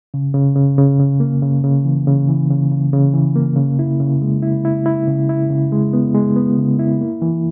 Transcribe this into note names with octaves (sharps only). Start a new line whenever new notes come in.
C#3
C#3
C#3
C#3
C#3
A#3
C#3
C#3
E3
C#3
E3
C#3
C#3
C#3
E3
A#3
C#3
E4
C#3
G#3
E4
E4
E4
C#3
E4
C#3
G#3
B3
G#3
B3
C#3
E4
A#3
E3